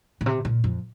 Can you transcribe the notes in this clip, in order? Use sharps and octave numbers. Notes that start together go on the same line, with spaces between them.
A#2
C3
A#2
F2